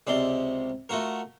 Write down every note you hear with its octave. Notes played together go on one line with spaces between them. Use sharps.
C#2 C3 D5 C6
A3 F4 F#4 A#4